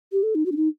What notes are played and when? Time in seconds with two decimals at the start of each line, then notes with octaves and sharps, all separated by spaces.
0.12 G4
0.23 A4
0.35 D#4
0.46 F#4
0.52 D4
0.57 D#4